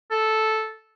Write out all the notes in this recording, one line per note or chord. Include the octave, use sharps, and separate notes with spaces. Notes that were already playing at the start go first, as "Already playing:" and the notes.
A4